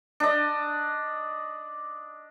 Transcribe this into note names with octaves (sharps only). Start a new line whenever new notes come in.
D4 D#5